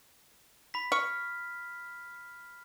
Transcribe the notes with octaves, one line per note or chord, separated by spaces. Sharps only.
B5 B6
C#6 F6